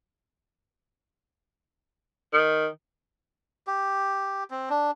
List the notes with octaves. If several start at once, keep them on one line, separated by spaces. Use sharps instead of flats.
D#3
G4
C4
D4